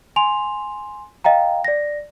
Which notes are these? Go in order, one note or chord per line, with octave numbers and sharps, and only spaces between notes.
G#5 C6 F7
D#5 F5 G5 A#5
D5 A#6